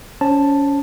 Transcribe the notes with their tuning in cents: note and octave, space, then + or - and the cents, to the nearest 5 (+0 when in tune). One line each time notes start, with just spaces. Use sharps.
C#4 +25 C5 +40 A5 +0